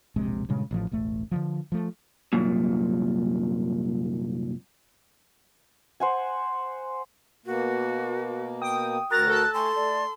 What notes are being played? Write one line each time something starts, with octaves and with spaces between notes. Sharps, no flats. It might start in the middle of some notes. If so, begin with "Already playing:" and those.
E1 A#1 C3 G#3
G2 A#2 C#3 G#3
A1 A2 F3
E1 A1 A3
D3 D#3 F3
F3 A3
C2 F#2 A#2
C5 F#5 G#5
B2 A#3 F#4
G5 D#6
D2 F#4 A#4 A#5 F#6 A6 A#6
A4 A5
A3 C#5 G#5 C6
A3 D5